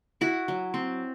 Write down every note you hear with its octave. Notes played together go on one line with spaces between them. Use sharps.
E4 F#4 F#5
F#3
C4